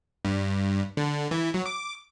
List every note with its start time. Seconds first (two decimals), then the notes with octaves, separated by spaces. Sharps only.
0.25 G2
0.97 D3
1.31 E3
1.54 F#3
1.66 D6